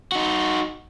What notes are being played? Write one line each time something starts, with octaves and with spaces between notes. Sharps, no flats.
D#4 F#4